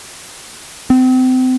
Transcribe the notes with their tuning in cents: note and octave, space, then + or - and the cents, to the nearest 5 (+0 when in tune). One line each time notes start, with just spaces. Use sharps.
C4 -35